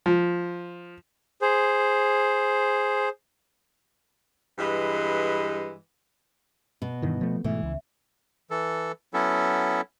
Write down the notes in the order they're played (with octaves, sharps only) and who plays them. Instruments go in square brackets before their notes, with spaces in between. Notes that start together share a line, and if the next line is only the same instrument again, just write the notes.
[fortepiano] F3
[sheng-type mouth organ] G#4 C5
[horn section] G2 E3 G#3
[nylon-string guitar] B2
[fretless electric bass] G2 D#3 E3
F3 A3
[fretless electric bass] G#2 B2 A3 [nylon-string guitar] E3
[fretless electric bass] C#2
[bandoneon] E3 A4
F#3 B3 C#4 E4 A4